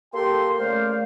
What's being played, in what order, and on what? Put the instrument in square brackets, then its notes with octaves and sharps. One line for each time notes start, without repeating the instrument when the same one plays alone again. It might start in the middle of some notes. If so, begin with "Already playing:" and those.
[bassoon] A#3 [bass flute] G4 [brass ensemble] A4 G5 [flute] C6
[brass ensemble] C#3 D5 F5 [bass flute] A3 [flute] C5